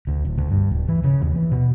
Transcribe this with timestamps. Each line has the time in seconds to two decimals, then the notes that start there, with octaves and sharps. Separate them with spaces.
0.07 D2
0.25 D1
0.38 D2
0.51 G2
0.72 D1
0.88 E3
1.04 C#3
1.22 D#2
1.35 E3
1.52 B2